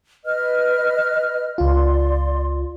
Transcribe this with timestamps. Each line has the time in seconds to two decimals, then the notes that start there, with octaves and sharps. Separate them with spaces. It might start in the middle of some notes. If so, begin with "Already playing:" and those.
0.24 B4 D#5 F6
1.58 C#2 F4 D5 C6